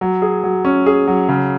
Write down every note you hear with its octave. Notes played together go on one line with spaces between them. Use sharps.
F#3
G#4
F#3
C#4
G#4
F#3
C#3